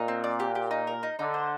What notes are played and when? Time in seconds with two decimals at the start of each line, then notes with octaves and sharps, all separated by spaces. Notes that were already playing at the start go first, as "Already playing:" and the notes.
Already playing: A#2 D#4
0.08 C4
0.24 D5
0.40 G4
0.55 G4
0.71 D#4
0.87 A#4
1.03 D#4
1.18 D3 D#4
1.34 C5